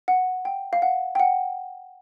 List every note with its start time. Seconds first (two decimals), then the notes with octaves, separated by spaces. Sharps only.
0.08 F#5
0.45 G5
0.73 F5
0.82 F#5
1.15 G5
1.20 F#5